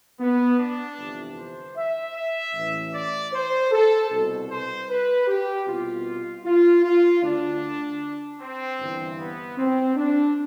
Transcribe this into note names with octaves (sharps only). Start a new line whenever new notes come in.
B3
D4
G1 F2 C3 E3
C5
E5
E5
A1 A2 E3
D5
C5
A4
C2 B2
C5
B4
G4
C2 B2 F4
F4
F4
D2 D3 D4
C4
G1 G2 E3
B3
C4
D4